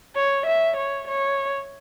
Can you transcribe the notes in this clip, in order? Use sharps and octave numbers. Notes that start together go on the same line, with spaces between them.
C#5
E5
C#5
C#5